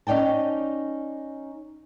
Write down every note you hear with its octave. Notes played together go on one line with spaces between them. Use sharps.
C#4 D#4 D5 G5 A5